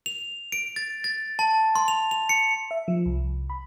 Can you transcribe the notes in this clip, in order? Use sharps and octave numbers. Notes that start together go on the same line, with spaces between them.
F7
D7
A6
A6
A5
C6
F7
F7
C#7
E5
F3
C2
B5